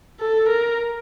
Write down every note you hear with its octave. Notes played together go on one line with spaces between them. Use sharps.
A4
A#4